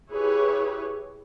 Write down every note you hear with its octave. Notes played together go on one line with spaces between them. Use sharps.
E4 G4 G#4 B4 C#5